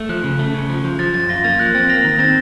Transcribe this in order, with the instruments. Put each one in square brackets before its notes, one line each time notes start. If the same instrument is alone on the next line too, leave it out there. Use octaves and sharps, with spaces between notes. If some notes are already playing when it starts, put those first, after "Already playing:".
Already playing: [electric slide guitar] A3
[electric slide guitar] F3 [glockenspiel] F#6
[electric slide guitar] C#3
A3
C#3
F3
F3
[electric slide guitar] F3 [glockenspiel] A6
[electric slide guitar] F#2 [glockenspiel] A6
[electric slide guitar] F4 [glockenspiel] A#6
[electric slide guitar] A#3 [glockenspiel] A6
[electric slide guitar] F3 [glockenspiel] F#6
[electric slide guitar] C4 [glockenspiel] A6
[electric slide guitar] A#3 [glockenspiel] A#6
[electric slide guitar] D#3
[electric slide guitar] C4 [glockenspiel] A6